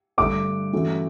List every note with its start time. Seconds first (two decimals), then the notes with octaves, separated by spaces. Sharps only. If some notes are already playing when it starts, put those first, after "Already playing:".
0.18 G2 D3 A3 D6
0.73 G2 E3 A3 C#4 F#4